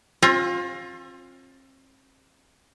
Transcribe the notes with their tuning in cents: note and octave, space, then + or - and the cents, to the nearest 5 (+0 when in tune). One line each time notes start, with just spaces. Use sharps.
C4 +45 F4 +20